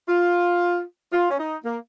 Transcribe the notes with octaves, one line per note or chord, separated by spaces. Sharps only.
F4
F4
C#4
D#4
A#3